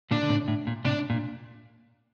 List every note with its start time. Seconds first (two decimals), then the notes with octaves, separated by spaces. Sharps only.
0.11 A#2 D3 D4
0.22 D3
0.30 A2 C3
0.48 A2
0.67 A#2
0.85 A2 C3 D4
1.10 A#2